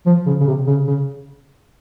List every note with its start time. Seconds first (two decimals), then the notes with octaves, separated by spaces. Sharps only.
0.07 F3
0.26 C#3
0.40 C#3
0.47 C3
0.67 C#3
0.87 C#3